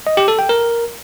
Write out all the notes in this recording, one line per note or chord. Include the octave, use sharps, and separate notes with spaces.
D#5
G4
A4
G5
A#4